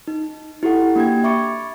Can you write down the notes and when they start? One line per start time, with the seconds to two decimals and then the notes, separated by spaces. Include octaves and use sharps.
0.08 D#4
0.63 E4 F#4 G4 A4 F#5
0.96 A#3 D4 G4 G5 G#6
1.24 E5 B5 C#6 D6 A6 C#7